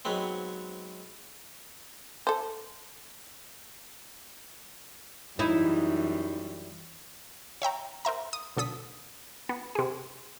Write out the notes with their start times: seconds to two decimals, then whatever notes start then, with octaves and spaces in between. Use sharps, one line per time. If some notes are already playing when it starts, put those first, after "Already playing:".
0.05 G#2 F#3 G#3 B3 C4
2.27 A4 C5
5.39 F#2 E3 G3 D#4 E4
7.62 C#5 E5 G5 A#5
8.05 A#4 C5 E5 A#5
8.33 D#6
8.56 B1 D3 A4 D#6 B6
9.49 B3
9.75 C3 G#4